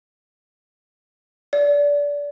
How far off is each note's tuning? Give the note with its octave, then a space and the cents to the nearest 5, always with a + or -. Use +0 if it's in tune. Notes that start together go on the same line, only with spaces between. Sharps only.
D5 -25